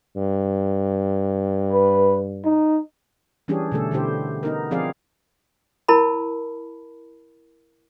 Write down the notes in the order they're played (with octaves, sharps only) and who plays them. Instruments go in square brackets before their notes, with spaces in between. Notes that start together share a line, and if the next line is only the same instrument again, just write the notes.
[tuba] G2
[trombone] B4
D#4
[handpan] E3 G3 C#4 D4 G4 G#4
B2 D3 A3 A4
B2 D3 E4 G4 C5
B3 D#4 A#4
F3 C4 G#4 D5 F5
[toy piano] E4 A#4 A5 B5